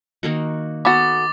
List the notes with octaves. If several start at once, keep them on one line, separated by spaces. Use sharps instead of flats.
D#3 A#3 F#4
B3 F#4 A4 B5 D6 A6